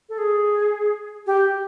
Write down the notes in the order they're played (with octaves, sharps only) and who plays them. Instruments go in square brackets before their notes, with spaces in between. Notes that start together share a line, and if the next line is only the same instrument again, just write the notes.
[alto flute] A4
G#4
G4